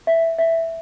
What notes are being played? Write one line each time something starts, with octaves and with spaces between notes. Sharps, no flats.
E5
E5